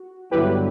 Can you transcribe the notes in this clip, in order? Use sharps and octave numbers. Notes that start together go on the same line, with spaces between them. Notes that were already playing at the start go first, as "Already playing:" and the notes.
Already playing: F#4
G2 D3 F#3 B3 E4 G4 B4